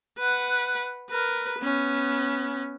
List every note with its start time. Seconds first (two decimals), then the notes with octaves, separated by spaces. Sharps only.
0.18 B4 F#5
1.10 A#4 B4
1.59 B3 C#4